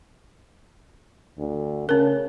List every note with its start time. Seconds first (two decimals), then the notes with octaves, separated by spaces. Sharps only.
1.39 D2
1.89 C#3 C#4 A#4